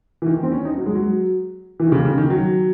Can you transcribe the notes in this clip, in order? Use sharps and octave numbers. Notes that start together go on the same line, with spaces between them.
E3
D#3
C4
C#4
D#4
F#3
G#3
F#3
E3
D#3
C#3
C#3
D#3
F#3